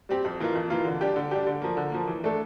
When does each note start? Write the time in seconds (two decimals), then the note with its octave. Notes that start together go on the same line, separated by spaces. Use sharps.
0.09 G3 C4 G4
0.25 F2
0.40 E3 A#3 F4
0.55 F2
0.70 E3 A#3 F4
0.85 D3
1.01 G3 D4 G4
1.16 D3
1.31 G3 D4 G4
1.47 D3
1.62 F3 A#3
1.77 D3
1.92 F3 A#3
2.07 E3
2.24 A3 D4 A4